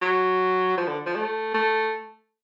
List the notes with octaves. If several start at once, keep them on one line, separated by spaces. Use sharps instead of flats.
F#3
F3
D3
F3
A3
A3